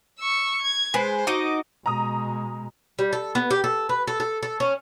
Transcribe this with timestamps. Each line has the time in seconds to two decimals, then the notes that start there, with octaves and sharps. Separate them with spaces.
0.19 C#6 E6
0.62 G#6
0.94 G#3 B4 C5
1.27 D#4 F#4 D#5 D6
1.86 B2 G#3 A#5 D#6
2.99 G3
3.13 A4
3.35 B3
3.51 G4
3.64 A4
3.89 B4
4.07 A4
4.20 A4
4.43 A4
4.60 C#4